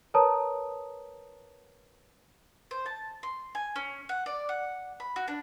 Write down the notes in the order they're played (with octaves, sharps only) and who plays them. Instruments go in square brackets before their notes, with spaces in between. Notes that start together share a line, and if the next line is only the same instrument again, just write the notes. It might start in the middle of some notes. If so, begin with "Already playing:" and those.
[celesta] A#4 B4 C#5 A5 A#5 D#6
[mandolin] C5
A5
C6
G#5
C#4
F#5
D5
F#5
B5
F#4
D4